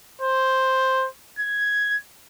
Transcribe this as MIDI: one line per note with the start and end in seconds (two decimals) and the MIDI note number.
0.21 1.07 72
1.39 1.96 92